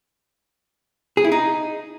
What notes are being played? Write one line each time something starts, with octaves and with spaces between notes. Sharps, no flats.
G#4
E4
D#4